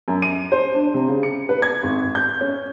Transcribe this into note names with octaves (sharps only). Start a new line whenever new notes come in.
F#2
D#7
C5
D4
C3
C#3
C#7
B4
G#6
G#1
G6
C#4